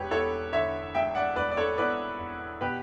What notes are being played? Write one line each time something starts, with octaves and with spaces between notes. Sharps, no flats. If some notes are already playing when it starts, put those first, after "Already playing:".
Already playing: E1 G4 B4 C#5
E2 A4 C#5
D3 C#5 E5
E1 E5 G5
D5 F#5
E1 B4 D5
D5
A4 C#5
E2 B4 D5
E1
B2 G4 B4